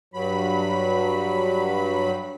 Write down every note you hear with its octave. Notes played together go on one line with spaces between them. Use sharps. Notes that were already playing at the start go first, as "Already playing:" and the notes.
G2 F#3 B5